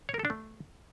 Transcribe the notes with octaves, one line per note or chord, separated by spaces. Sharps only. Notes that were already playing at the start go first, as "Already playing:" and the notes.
C#5
A#4
A4
D4
A3